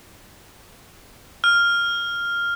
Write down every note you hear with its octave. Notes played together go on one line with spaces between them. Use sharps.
F6